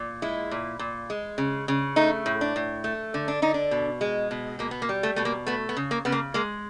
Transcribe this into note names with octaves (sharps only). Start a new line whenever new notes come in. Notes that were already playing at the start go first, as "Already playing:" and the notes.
Already playing: A#2
G#3 E4
A#2
A#2
G#3
C#3
C#3
A3 D#4
A2
D4
A2
A3
D3
D4
D3 D#4
D4
B2
G#3
B2
B2 A#3
B3
A#3
G3
A3
B2 A3
A#3
A3 B3
B3
C#3
A#3
C#3 B3
A#3
G#3 A#3